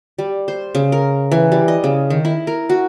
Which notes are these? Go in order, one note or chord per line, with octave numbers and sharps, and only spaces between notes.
G3
C5
C#3
A#4
E3
G3
D#5
C#3
D#3
E4
A#4
F#4